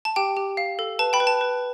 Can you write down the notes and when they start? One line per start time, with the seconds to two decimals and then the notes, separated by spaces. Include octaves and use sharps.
0.05 A5
0.16 G4 G5
0.37 G4
0.57 F5
0.79 A4
0.99 B4 A5
1.13 G5 B5
1.20 B4
1.27 A5
1.41 B4